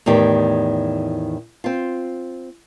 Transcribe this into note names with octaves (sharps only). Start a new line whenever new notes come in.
E2 A2 D#3 G4
C4 F4